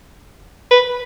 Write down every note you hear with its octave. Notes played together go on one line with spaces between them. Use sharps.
B4